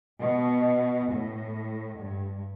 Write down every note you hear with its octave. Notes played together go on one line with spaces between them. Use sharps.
B2
A2
G2